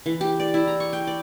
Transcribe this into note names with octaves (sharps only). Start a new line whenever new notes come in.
E3
G4
D5
E4
A#5
C#6
G5
D5